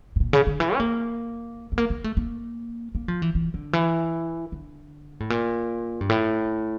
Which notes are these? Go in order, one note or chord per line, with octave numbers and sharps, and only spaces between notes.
A2
A#2
C#3
D3
E3
C#4
A#3
A3
A#3
A#3
A3
A#3
A#3
F3
E3
E3
D3
E3
D3
A2
A#2
G2
A2